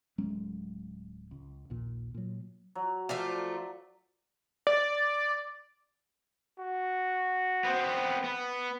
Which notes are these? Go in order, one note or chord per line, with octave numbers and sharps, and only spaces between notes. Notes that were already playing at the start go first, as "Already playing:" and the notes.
D1 F#3 G#3 C#4
C#2
A#1 D#2 A#2
A#2 F#3
F#3
F3 A3 F4 A4 D5
D5
F#4
B3 C4
B3